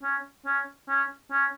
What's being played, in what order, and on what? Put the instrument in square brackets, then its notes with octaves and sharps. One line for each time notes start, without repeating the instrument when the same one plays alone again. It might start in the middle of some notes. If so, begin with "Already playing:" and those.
[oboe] C#4
C#4
C#4
C#4